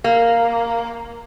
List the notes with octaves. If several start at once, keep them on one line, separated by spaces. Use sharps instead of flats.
A#3